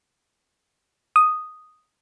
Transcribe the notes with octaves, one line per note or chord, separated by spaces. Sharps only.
D#6